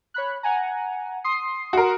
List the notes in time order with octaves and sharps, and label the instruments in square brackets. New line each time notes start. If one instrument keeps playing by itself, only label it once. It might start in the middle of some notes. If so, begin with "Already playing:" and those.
[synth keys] C#5 B5 F#6
F#5 G#5 A#5
C6 D#6 C7
[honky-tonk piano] F#4 A#4